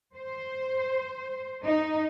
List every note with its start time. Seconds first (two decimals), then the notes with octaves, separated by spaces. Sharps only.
0.17 C5
1.64 D#4